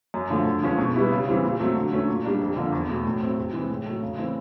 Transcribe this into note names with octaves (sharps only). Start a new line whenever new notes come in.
F#2
D3 F3 A3
D3
F3 G#3 C#4
B2
G3 B3 E4
C#3
E3 G3 C4
A#2
F#3 A3 C4
D3
F#3 A3 C#4
A#2
G3 A#3 D4
F2
D3 F3 A#3
E2
B2 F#3 A3
A2
F#3 A3 C4
C3
E3 G#3 C4
A2
F#3 A3
C#3
E3 A3 C4